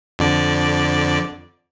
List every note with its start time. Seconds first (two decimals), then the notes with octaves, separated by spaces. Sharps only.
0.19 F2 D3 D5